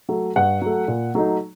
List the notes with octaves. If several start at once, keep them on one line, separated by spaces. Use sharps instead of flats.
F#3 A3
G2 F#5
F#3 A3
A#2
F#3 A3 D#4